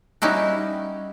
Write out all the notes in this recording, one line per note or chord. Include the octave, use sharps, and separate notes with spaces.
G3 C#4 D#4 E4 F#4